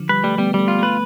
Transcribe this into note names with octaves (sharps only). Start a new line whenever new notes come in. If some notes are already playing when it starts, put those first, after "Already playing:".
Already playing: D3 F3
G3 B4
G3 A3
G3 B3
G3 A3
F4
A3 B4